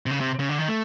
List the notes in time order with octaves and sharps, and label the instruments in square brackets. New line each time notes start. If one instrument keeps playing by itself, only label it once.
[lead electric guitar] C3
C#3
C3
C#3
D3
D#3
A3